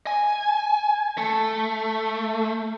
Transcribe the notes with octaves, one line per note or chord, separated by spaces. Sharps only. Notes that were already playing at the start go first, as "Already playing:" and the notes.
G#5
A3